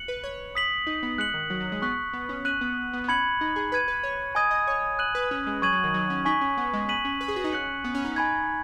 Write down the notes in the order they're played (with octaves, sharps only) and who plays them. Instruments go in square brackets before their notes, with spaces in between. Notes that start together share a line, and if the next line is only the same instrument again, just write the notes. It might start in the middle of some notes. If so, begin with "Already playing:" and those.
Already playing: [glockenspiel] F#6 C#7 F#7
[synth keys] B4
C#5
[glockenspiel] D#6 B6 F#7
[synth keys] D#4
B3
[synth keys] G#3 [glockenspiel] F#6 C#7 F#7
[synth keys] D#3
F#3
F#3
G#3
[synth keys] B3 [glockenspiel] C#6 F#6 B6
[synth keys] B3
C#4
[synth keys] C#4 [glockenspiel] F#6 D#7 F#7
[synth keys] B3
B3
B3
[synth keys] C#4 [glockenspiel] B5 G#6 C#7 F#7
[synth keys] D#4
G#4
[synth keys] B4 [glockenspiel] B5 G#6 D#7
[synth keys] B4
C#5
[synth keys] D#5 [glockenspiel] G#5 D#6 G#6 D#7
[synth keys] D#5
C#5
[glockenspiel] F#6 D#7 F#7
[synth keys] B4
C#4
G#3
[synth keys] F#3 [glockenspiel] C#6 G#6 D#7 F#7
[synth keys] F#3
D#3
F#3
C#4
[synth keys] D#4 [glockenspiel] G#5 C#6 B6 F#7
[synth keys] C#4
B3
G#3
[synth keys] B3 [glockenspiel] F#6 B6 D#7 F#7
[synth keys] C#4
B4
G#4
F#4
D#4
[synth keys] C#4 [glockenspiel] F#6 C#7 F#7
[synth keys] B3
C#4
D#4
[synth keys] D#4 [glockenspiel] G#5 B5 G#6